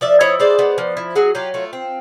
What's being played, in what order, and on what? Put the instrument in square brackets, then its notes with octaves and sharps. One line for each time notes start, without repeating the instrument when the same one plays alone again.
[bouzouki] F3 D5 E5
E4 C#5 D#5
G#3 C5 D5
B3
F3
E4
F#3 F#4 G#4
F#3 F4 G4
A3 F4
C4